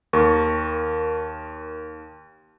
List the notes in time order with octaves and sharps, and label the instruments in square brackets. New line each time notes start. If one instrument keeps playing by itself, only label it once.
[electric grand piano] D#2 A#4 C#6